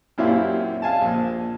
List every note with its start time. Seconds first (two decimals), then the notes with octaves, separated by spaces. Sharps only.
0.18 F#2 A#2 C4 E4 G4 F5
0.82 F5 G#5 A5
1.01 A#1